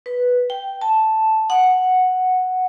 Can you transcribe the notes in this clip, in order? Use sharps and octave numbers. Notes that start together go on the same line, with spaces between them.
B4
G5
A5
F#5